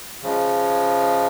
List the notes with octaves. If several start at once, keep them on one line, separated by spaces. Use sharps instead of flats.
C#3 F3 G#3